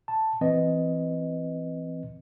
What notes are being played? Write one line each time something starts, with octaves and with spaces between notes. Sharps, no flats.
A5
E3 C4 B4 D#5